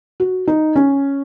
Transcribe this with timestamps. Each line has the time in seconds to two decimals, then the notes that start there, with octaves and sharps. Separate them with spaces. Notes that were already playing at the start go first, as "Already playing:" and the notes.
0.20 F#4
0.48 D#4
0.76 C#4